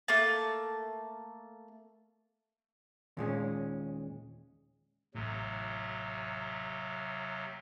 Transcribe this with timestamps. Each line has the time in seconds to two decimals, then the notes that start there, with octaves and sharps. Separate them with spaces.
0.08 A3 A#3 A5
3.17 D#2 A#2 G#3 C#4
5.14 A1 D#2 A2 C3 F#3